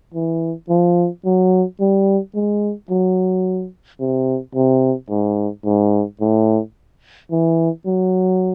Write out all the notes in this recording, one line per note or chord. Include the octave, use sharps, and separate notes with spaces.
E3
F3
F#3
G3
G#3
F#3
C3
C3
G#2
G#2
A2
E3
F#3